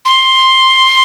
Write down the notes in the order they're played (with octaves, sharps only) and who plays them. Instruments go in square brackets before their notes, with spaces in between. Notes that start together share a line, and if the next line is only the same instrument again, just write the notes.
[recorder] C6